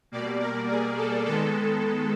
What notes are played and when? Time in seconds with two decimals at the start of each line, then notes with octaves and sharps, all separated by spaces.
0.12 B2 G3 A#3 D5
0.40 A#4
0.69 G#4
0.97 A4
1.26 D#3 G#3 B3 A4